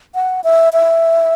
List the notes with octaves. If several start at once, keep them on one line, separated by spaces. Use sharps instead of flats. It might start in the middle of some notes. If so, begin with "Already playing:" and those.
F#5
E5
E5